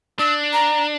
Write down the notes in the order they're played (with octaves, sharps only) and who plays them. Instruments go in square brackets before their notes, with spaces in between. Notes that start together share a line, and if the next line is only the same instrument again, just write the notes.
[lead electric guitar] D4 [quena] E6
[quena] A#5